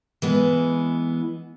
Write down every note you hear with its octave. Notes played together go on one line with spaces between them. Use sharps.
E3 G#3 B3